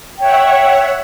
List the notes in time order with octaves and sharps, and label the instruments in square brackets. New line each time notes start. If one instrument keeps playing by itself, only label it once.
[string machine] C#5 E5 F#5 [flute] G5